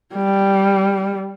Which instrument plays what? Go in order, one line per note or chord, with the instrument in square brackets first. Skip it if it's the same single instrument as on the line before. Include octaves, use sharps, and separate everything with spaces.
[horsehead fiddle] G3